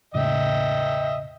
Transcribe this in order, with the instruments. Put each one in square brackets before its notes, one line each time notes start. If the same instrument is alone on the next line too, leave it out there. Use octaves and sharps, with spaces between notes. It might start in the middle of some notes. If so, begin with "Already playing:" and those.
[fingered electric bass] E1 A2 C#3 [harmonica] D#5 E5 G5